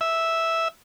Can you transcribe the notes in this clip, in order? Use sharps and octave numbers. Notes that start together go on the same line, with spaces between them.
E5